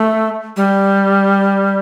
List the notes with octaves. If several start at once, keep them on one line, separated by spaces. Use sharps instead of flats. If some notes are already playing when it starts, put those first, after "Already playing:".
Already playing: A3
G3